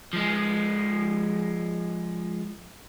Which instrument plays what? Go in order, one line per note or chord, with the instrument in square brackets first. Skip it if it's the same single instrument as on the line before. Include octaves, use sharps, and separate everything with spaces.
[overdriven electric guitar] F3 G#3